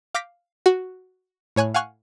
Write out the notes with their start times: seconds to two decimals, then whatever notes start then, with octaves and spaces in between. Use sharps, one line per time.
0.15 F5 D6 G6 A#6 B6 D7
0.66 F#4
1.56 A2 C#5 G#5 C#6 F#6
1.74 F5 F#5 G#5 C#6 F6 F#6